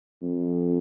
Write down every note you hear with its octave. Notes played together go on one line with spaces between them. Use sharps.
F2